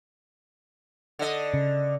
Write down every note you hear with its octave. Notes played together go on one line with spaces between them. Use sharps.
D3 D#5
C#3